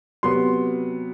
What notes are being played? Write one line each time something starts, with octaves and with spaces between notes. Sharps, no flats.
C3 F#3 B3 C6